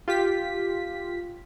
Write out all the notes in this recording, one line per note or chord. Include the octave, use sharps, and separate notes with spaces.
F4 G4 B6